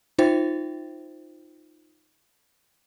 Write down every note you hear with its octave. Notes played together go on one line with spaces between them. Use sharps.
D#4 F4 C5 E5 G5 A6